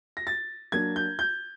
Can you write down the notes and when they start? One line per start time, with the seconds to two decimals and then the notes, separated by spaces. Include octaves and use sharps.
0.17 A#6
0.27 A6
0.72 F#3 A#3 D4 G#6
0.96 G6
1.19 G6